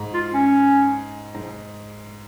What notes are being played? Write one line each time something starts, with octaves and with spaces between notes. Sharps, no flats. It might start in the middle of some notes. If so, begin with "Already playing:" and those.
Already playing: G#2
F4
C#4
G#2